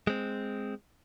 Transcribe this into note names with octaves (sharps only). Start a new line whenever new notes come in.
G#3 C4